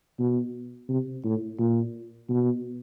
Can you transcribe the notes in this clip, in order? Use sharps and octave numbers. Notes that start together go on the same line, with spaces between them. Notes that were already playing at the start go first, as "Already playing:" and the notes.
B2
C3
A2
A#2
B2